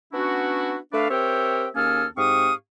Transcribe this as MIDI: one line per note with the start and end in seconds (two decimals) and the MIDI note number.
0.13 0.76 59
0.13 0.76 61
0.13 0.76 62
0.13 0.76 64
0.13 0.76 66
0.93 1.09 57
0.93 1.09 62
0.93 1.09 69
0.93 1.09 71
0.93 1.09 74
0.93 1.09 77
1.10 1.68 60
1.10 1.68 67
1.10 1.68 70
1.10 1.68 73
1.10 1.68 76
1.10 1.68 79
1.76 2.06 39
1.76 2.06 58
1.76 2.06 61
1.76 2.06 68
1.76 2.06 69
1.76 2.06 89
2.17 2.53 44
2.17 2.53 60
2.17 2.53 67
2.17 2.53 77
2.17 2.53 85
2.17 2.53 87